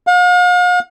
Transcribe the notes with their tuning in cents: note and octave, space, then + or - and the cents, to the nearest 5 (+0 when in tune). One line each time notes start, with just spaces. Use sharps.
F5 +45